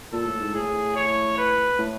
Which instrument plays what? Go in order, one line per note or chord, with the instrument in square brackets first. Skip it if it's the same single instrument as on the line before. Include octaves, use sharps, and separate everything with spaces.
[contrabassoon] A#2 [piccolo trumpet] A4
[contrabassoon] A2
G#2
[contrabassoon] A2 [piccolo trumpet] G#4
[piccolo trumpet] C#5
B4
[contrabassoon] A2